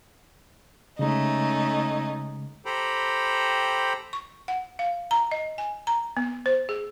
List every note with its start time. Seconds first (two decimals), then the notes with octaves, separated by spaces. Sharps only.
0.99 C#3 G#3 A3 C#4 D#4
2.66 G4 A4 C5 G5 A#5 B5
4.13 C#6
4.48 F#5
4.79 F5
5.11 A#5
5.32 D#5
5.58 G#5
5.87 A#5
6.17 B3
6.46 C5
6.69 G#4